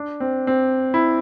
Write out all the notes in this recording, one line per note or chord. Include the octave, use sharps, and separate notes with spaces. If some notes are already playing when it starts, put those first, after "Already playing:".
Already playing: D4
C4
C4
E4